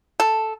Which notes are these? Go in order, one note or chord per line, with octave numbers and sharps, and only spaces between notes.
A4